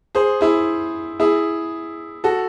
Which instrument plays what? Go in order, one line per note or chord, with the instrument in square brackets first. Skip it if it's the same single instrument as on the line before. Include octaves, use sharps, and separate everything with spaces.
[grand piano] G#4 C5
E4 G#4
E4 G#4
F#4 A4